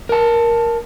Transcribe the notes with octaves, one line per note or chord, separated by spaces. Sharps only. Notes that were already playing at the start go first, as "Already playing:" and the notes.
A#4 A5